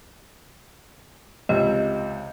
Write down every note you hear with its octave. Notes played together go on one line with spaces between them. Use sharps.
C#2 C3 D#5